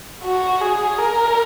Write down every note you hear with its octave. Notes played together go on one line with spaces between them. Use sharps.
F#4
G#4
A#4